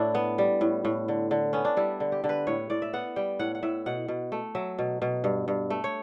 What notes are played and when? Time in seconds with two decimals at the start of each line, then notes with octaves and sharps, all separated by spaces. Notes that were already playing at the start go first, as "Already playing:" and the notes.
Already playing: A2 D4 E4
0.15 B3
0.38 G3
0.61 A2
0.85 A2
1.08 D3
1.31 D3
1.53 B3 C#4
1.65 D4
1.77 G3 E4
2.00 D3
2.12 G4
2.24 D3
2.29 B4
2.47 A2 C#5
2.70 A2 D5
2.82 E5
2.93 B3 F#5
3.16 G3 G5
3.39 A2 F#5
3.55 F#5
3.63 A2 E5
3.86 B2 F#5
4.08 B2
4.32 A3
4.55 F#3 E5
4.79 B2
5.02 B2
5.24 G2
5.48 G2
5.70 A3
5.84 C#5